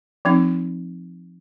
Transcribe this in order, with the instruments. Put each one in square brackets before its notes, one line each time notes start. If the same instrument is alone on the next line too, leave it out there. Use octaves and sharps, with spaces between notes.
[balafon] F3 C4 D#4